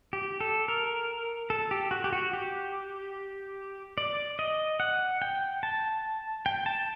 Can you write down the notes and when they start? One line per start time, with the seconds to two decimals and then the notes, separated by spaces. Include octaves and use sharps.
0.13 G4
0.40 A4
0.68 A#4
1.50 A4
1.71 G4
1.91 F#4
2.04 G4
2.13 F#4
2.33 G4
3.98 D5
4.39 D#5
4.80 F#5
5.22 G5
5.63 A5
6.46 G5
6.66 A5